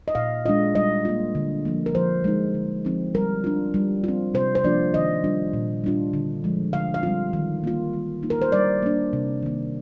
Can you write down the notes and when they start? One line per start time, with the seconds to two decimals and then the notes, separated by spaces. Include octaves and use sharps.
0.08 D#5
0.15 A#2 F5
0.46 G#3 D4 F4 D#5
0.75 G3 D#5
1.05 A#3 F4
1.35 D3
1.65 F3 A#3
1.86 A#4
1.95 F3 C5
2.24 G#3 D#4
2.55 D3
2.85 F3 C4 D#4
3.15 G3 A#4
3.44 D4 F4
3.74 G3
4.04 C4 F4
4.34 C3 C5
4.55 C5
4.64 F3 A#3 D4 F4 D5
4.94 D#3 D#5
5.24 G3 D4 F4
5.53 A#2
5.84 G3 D4 F4
6.13 D3
6.44 F3 G#3
6.73 D3 F5
6.94 F5
7.03 G3 C4 F4
7.33 D#3
7.64 A#3 F4
7.93 G3
8.23 A#3 D#4
8.30 A#4
8.42 C5
8.52 G3 D5
8.83 A#3 D4
9.13 C3
9.43 D#3 A#3